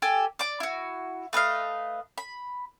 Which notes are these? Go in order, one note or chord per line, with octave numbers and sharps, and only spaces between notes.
G4 A4 G#5
D5 D6
E4 F#4
A3 B4 D#5 F5
B5